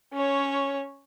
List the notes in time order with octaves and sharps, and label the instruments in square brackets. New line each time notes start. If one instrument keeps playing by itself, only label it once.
[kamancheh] C#4 C#5